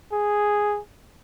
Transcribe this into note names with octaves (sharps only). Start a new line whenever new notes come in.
G#4